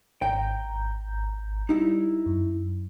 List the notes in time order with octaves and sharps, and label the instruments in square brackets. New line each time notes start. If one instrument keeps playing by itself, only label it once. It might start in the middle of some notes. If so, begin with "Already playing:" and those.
[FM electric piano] G#1 A#5 G6 [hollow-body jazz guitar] G5
[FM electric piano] G3 [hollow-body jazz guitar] D#4 E4
[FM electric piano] F#2